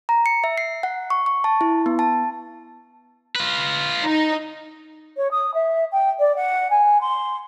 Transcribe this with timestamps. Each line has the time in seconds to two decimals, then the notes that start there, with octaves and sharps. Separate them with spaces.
0.09 A#5
0.26 C#7
0.44 E5
0.58 C7
0.83 F#5
1.10 C#6
1.26 C#6
1.44 A5
1.61 E4
1.86 B3
1.99 A5
3.36 F4 B4
4.03 D#4
5.16 C#5
5.31 D#6
5.54 E5
5.91 G5
6.19 D5
6.36 F#5
6.70 G#5
7.01 C6